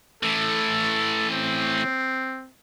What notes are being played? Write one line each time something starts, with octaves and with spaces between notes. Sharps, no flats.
A2 E3 A4
C4